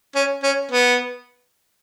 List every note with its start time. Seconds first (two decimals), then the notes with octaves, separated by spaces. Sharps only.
0.15 C#4
0.43 C#4
0.71 B3